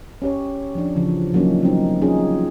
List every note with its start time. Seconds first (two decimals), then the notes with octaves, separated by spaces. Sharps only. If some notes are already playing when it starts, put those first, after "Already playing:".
0.22 C#4 G4 C#5
0.75 F3 D4
0.96 C#3 E3 F3
1.32 B2 F3 F#3 A#3 C#4 D#4
1.63 F#3 G3 C4 C#4 D#4
2.02 C#4 D#4 F4 G#4